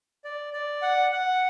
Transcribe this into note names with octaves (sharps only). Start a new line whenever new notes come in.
D5
D5
F#5
F#5